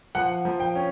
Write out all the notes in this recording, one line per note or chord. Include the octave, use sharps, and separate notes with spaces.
F3 F#5
F3
G5
C#4